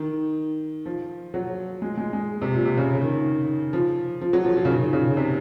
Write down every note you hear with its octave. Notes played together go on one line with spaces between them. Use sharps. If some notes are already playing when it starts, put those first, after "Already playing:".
Already playing: D#3
F3
F#3
G#3
G#3
G#3
C3
A#2
C3
C#3
D#3
F3
F3
F#3
F3
F3
C#3
D#3
C#3
C3